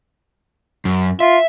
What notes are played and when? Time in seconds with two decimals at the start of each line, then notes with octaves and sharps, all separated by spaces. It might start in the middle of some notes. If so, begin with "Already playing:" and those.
0.85 F#2
1.20 F4 E5